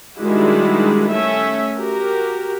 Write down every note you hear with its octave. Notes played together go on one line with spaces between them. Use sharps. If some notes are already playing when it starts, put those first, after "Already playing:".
D#3 G3 G#3 D4 E4 F#4
A3 C#4 E5
F#4 G4 A#4